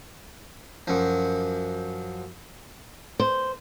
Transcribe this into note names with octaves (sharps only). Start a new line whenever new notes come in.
F#2 F3
C5